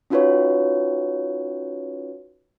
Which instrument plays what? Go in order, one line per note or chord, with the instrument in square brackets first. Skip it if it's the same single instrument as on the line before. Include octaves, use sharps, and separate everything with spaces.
[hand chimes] C#4 D#4 F4 F#4 B4 C#5